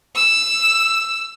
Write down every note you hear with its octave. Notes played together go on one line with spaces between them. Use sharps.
E6